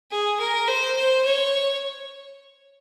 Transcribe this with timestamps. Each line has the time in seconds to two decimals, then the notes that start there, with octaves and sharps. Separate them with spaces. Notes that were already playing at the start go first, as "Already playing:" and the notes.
0.11 G#4
0.40 A#4
0.68 C5
0.97 C5
1.25 C#5